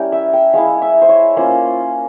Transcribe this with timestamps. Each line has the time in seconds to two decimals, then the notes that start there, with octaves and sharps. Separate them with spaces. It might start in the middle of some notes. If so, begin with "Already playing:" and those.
Already playing: G3 C#4 E4 G4 A#4
0.12 E5
0.33 G5
0.54 G#3 E4 F5
0.82 E5
1.02 C5
1.09 C#5
1.36 A#3 C#4 F4 C5